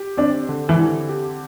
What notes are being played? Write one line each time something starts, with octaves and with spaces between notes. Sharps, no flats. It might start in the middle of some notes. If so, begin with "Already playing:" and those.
Already playing: G4
C4 D4
D3
E3
D3
G4